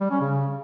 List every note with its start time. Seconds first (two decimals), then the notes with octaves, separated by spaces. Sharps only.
0.01 G3
0.11 C#4
0.20 C#3